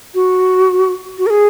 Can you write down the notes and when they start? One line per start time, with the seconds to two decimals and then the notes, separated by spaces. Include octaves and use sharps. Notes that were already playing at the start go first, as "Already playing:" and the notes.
0.15 F#4
1.18 F#4
1.26 A#4
1.30 G#4